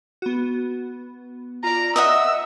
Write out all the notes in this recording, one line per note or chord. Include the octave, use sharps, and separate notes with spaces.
B3 F#4
F4 D5 A#5
D#5 E5 F#5 E6